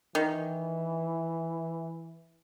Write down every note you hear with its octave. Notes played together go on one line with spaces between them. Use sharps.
D#3 E3